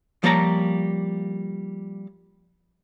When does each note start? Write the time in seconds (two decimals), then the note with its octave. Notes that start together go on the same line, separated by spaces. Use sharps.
0.24 F3 G3 A#3 C#5 A5 A#5